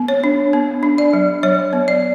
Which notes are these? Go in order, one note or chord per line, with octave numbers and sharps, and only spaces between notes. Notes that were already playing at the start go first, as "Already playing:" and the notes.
Already playing: B3
C#5
D4
B3
D4
D5
F#3
F#3 C#5
B3
D5